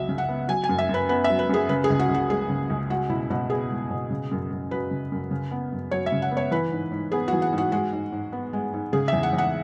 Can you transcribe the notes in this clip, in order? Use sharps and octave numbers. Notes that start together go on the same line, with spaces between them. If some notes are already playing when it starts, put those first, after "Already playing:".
Already playing: C#2 F#3 B3 E5
C#3
F#5
B3
F#3 G#5
G#5
F#2
E5
F#2
B4
B3 B4
E5
F#3
B4
F#2 G#4
C#3 B4
G#4
C#2
F#4
C#2
F#4
G#3 G#4
C#3
C#2
G#3 F#4
B2 E4
B2 F#4
B3 G#4
G#3
B2
C#3
F#2
F#2
F#3 B4
C#3
F#2
C#3
B3
F#2
F#3 C#5
E5
C#3
F#5
B3
C#5
E3 B4
G#2
G#2
B3 G#4
E3 F#4
F#5
G#2
F#4
G#3 F#4
G#2
G#2
B3
G#3
G#2
C#3 G#4
E2 E5
F#5
E2
F#5